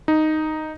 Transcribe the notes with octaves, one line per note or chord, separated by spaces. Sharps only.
D#4